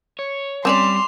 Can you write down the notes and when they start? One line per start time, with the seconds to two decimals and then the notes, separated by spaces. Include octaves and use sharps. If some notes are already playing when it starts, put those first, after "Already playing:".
0.19 C#5
0.65 G3 C4 C#4 D5 C6 D6 E7 F7